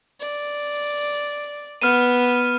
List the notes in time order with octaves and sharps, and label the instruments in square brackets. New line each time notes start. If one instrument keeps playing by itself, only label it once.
[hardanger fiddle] D5
[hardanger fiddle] B3 [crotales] F6 D#7